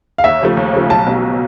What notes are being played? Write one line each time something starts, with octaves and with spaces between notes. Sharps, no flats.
F5
D#2 E5
C#3 F3 A3
D#2
C#3 F3 A3
B1 A5
B2 F#3